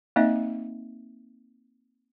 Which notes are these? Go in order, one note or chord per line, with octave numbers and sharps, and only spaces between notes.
A#3 C4 D#4 D#5 E5